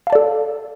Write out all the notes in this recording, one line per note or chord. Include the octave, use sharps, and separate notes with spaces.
A4 D5 F5 A5